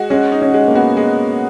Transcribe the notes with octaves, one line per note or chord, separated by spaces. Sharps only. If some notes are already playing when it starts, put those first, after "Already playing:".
Already playing: G#3 F#4
G#3 C#4
D#4
C#4
G#3
A#3
B3 F#4
G#3